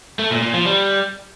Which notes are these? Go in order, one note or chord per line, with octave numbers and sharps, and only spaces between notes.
A3
A#2
A#2
F3
G3